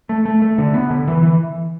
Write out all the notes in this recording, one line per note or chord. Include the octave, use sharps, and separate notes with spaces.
A3
A3
A3
D3
B3
D3
E3
E3